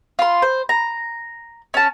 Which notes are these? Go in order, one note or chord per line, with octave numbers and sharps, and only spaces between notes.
F4 C6
C5
A#5
C#4 A5